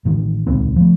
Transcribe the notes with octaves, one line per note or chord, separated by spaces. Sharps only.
A1 D#3
D#1 C#2 D#3 C4
F3 A3